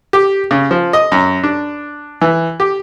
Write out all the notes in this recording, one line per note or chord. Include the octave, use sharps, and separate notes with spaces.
G4
C#3
F3
D#5
F#2
D4
E3
G4